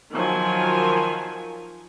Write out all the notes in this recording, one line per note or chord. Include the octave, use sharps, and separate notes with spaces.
D#3 F3 F#3 F4 G#5